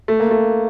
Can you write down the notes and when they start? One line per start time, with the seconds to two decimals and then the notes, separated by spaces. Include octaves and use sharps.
0.08 A3
0.20 A#3
0.31 A3